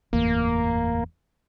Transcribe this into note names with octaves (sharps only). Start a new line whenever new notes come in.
F#1 E2 A2 A#3